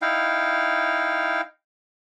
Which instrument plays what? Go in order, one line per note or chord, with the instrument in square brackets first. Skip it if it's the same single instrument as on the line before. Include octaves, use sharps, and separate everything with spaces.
[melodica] D#4 E4 F5 G5